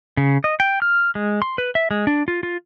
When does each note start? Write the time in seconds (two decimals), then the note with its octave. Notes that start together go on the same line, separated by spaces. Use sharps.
0.17 C#3
0.44 D#5
0.60 G5
0.82 F6
1.15 G#3
1.42 C6
1.58 B4
1.75 E5
1.91 G#3
2.07 D4
2.28 F4
2.43 F4